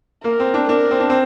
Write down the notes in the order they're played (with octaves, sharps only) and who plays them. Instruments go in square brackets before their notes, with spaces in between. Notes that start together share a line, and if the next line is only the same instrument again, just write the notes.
[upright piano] A#3 [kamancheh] A#4
[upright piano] C4
D4
[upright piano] D4 [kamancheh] A#4
[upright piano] C4
D4
C4